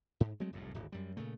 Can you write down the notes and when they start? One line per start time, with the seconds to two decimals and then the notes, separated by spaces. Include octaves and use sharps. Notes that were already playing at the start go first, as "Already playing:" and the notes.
0.20 G#2
0.40 F#3 G#3 A3 C4
0.53 F1 C2 F#2 A2
0.75 D1 G#1
0.92 F#2 G3
1.17 A#2 C#3 A3